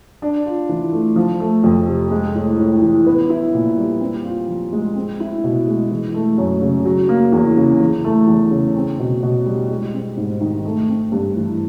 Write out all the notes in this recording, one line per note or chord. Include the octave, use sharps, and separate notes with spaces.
D4
F4
E3
A3
F3
A3
F2
C3
G#3
A2
A2
E3
B3
E4
A#2
G3
C4
F4
F3
G#3
C4
E4
B2
G#3
E3
A3
F#2
C#3
F#3
A#3
E2
C#3
E3
A3
E2
C#3
C4
B2
B2
G3
G#3
C4
G#2
D#3
A3
C4
G2
E3